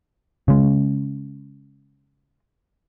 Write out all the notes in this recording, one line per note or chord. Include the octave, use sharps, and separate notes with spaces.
C#3 G#3